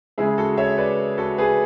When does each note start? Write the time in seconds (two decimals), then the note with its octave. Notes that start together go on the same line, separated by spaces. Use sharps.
0.18 C#3 G#3 E4 G#4
0.38 F#4 A4
0.58 C#5 E5
0.78 B4 D5
1.18 F#4 A4
1.38 G#4 B4